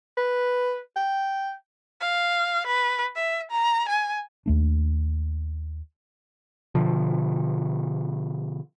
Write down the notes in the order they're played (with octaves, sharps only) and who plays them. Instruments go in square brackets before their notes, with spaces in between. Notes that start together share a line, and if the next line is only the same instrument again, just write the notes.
[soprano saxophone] B4
G5
[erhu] F5
B4
E5
A#5
G#5
[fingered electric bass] D#2 A3 D4
[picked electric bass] B2 D3 F3